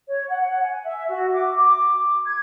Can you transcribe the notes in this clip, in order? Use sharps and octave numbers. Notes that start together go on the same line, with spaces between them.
C#5
F#5
F#5
G#5
E5
F#4
D6
D6
G#6